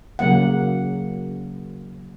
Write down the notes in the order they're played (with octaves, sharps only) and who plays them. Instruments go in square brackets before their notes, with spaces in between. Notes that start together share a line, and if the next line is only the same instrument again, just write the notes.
[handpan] C#3 F#3 A#3 F#5